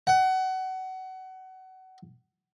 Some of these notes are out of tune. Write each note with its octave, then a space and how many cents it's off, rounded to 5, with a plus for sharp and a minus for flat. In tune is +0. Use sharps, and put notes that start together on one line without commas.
F#5 +25